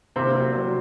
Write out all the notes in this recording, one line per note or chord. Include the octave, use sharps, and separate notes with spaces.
C3 A#3 C4
F#3
F#3